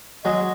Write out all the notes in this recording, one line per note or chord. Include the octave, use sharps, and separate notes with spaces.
F#3 G#3 D#5